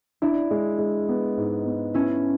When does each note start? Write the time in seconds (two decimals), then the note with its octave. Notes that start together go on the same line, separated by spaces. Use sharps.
0.22 D4 E4
0.51 G#3
0.79 G#3
1.09 B3
1.37 G#2
1.66 B3
1.94 B3 C#4 E4